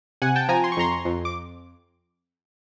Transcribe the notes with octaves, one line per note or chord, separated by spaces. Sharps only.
C3 F#5 G#5
G5 A5
F3 G#5 A#5
C6
C#6
F2 A#5 C6
F2
D6